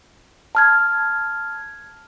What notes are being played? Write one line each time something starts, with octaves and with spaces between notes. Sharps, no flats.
A5 F6 G#6